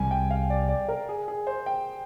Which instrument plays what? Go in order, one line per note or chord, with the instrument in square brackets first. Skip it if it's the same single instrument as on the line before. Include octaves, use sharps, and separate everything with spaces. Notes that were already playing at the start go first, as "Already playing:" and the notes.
Already playing: [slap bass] C2 C3 G3 [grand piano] G#5
[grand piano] G5
F5
D5
D5
A#4
G#4
G#4
C5
G5